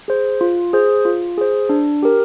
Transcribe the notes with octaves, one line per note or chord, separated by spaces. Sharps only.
G#4 C5
F4
G#4 C5
F4
G#4 C5
D4
G4 A#4